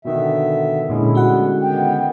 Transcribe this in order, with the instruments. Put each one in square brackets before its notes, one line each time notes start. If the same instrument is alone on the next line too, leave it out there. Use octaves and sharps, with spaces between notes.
[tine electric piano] B2 D#3 B3 [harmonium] D3 E5
[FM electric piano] A#2 [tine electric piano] D3 G#3 C#4 [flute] E4
[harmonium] G3 B3 [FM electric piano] F#4 F#5
[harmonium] D#3 B3 [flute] G5